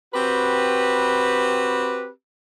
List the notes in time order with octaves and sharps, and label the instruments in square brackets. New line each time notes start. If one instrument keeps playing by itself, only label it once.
[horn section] C4 F#4 G4 B4